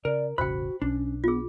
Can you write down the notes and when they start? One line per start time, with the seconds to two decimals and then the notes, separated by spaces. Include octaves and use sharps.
0.05 C#3 A#4 D5
0.38 E1 A1 C#3 F#4 C5 G5 B5
0.82 B1 C#4 D4
1.24 B3 F4 G#4